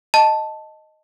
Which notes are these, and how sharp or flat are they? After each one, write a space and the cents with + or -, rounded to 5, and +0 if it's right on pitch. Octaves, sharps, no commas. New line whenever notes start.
D#5 +0 A5 +0